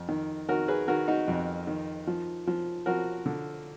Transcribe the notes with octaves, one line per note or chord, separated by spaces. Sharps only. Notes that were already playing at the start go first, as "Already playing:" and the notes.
Already playing: F2
D#3
D#3 F#4 A#4
G#4 B4
D#3 F#4 A#4
D#4 F#4
F2
D#3
F3
F3
F3 F#4 A#4
D3